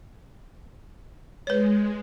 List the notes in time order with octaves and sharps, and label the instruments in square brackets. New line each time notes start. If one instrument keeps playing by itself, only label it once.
[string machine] G#3 [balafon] B4 C#5